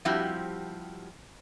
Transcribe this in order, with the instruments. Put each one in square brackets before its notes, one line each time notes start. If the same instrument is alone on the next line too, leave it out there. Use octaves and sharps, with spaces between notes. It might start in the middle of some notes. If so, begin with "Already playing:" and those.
[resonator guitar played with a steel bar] F3 G3 C4 E4 F#4 G4